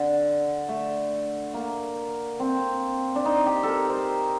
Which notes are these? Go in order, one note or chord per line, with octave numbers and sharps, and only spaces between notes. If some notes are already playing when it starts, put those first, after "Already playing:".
Already playing: D3
A3
A#3
C4
D4
D#4
G4
A4
A#4
C5